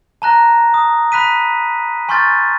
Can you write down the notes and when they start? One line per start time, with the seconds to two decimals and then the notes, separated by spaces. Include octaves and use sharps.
0.22 A5 A#5 F#6 A#6
0.74 D#6
1.12 B5 F#6 B6 D#7
2.09 G#5 C6 C#6 F6 G6 A6